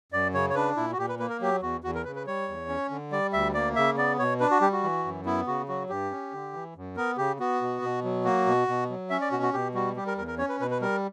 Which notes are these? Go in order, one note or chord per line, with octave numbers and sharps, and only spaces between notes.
F#2 D5
C#3 C#5
C#5
D4 B4
A#2 E4
F#4
A#2 G4
B4
A#3 B4
A#4
F#3 G4
E2 F#4
E2 F#4
A#4
C#3 B4
B4
G3 C#5
E2
C#4
D3
G3 D5
D2 E5
A#3 D5
C#3 E5
B3 D5
B2 C#5
D4 B4
F#4
G3 G4
F#4
E3
F#2
B3 E4
C#3 F#4
F#3 F#4
G2 G4
C#4
D3
E3
F#2
B3 A#4
C#3 G4
B3 F#4
B2
B2
F#3
A#3 F#4
B2
B2
F#3
C#4 E5
D5
B2 F#4
F#4
B2 G4
G3 F#4
G3 G4
A#4
E2 A#4
A#4
C#4 C#5
B4
B2 B4
B4
G3 A#4